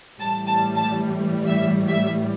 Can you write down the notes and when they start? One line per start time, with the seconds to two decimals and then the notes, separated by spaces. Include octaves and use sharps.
0.19 A2 E3 G3 A5
0.47 A5
0.75 A5
1.46 E5
1.88 E5